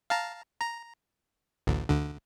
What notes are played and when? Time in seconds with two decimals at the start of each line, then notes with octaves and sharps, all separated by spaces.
0.10 F5 A5 A#5
0.61 A#5
1.67 A1 D2
1.89 D2 D3